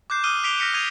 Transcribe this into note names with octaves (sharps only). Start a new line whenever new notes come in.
D6 F#6 G6 C7
D6 D#6 F6 F#6 D#7 G7
D6 B6 C7 D7 F7 G7
F6 A#6 B6 C#7 D#7
D#6 G#6 D#7 F7 G7